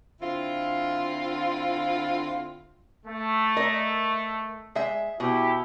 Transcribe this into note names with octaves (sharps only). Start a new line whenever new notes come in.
D3 C4 E4 F4
A3
A#4 D#5
G#3 E5
B2 E4 G4